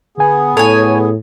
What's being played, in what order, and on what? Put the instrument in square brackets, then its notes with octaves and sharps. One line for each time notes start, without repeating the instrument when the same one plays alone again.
[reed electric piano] D3 G#5 [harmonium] B3 G#4
[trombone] A2 [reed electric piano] A4 [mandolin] C#5 G#5